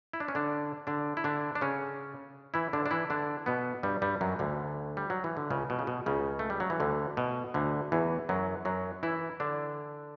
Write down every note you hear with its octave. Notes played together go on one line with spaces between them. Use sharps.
E4
D4
C#4
D3 D4
D3 D4
E4
D3 D4
D4
C#3 C#4
E3 E4
D3 D4
D4
E3 E4
D3 D4
B2 B3
G2 G3
G2 G3
F#2 F#3
D2 D3
G3
F#3
E3
D3
C#2 C#3
B2
C#3
B2
C#2 C#3
A3
G3
F#3
E3
D2 D3
B2
D2 D3
E2 E3
F#2 F#3
F#2 F#3
E3 E4
D3 D4